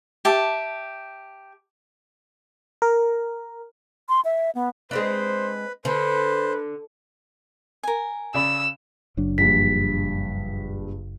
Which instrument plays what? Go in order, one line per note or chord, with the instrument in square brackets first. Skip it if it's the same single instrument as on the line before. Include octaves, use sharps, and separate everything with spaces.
[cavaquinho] G4 E5 A5
[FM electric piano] A#4
[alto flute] C6
E5
B3
[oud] G#3 C4 D4 [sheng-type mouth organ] B4 [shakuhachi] C5
[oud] D3 [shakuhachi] B4 [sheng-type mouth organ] C5
[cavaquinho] A#4 G#5
[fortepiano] C#3 D5 B5 [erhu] E6
[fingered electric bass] F#1 F#3 D4
[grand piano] A#1 G2 [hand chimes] B6